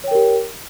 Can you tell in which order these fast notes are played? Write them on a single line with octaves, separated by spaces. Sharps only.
C#5 G5 A#4 G4